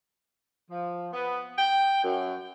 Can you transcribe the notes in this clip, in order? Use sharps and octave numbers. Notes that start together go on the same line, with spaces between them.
F3
B3
G5
F#2